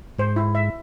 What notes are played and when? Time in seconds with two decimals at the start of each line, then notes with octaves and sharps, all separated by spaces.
0.19 G#2 C5
0.36 E4
0.55 E5